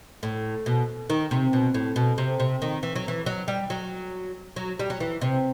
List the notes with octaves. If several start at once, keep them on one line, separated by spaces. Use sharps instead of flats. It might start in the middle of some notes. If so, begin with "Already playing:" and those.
A2
B2
D#3
C3
B2
A2
B2
C3
C3
D#3
E3
F#3
E3
F#3
G3
F#3
F#3
G3
F#3
E3
C3